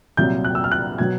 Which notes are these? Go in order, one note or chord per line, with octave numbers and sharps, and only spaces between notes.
C2 A#2 F#3 G6
F#6
E6
F6
F#6
B2 F#3 G#6